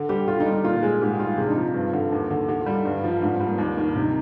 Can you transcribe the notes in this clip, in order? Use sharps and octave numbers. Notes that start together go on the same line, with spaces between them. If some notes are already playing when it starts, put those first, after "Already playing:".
Already playing: D3
G3 G4
D3 F4
D#4
G3
D#4
A#2 F4
G#3 G#4
G#2 G4
G3 F4
C3 G#4
D4
D#4
F3
G2
D3
D#2
D3
D3 G4
F4
G3
D#4
G2 D4
F3 D#4
G#2 D4
C4
G3
A#3
D#2 D#4
D#3 D#4
D4
C3
D#4